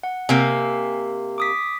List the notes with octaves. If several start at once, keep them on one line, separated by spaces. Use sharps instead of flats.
F#5
C3 A#3 G#5
D6 D#6 B6